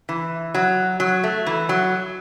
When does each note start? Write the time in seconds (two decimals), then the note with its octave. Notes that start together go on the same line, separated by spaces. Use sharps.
0.09 E3
0.55 F#3
1.00 F#3
1.24 A3
1.46 E3
1.69 F#3